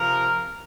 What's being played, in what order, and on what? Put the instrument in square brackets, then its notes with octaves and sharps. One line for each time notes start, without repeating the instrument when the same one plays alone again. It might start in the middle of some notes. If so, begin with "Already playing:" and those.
Already playing: [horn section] C3 F3 A#4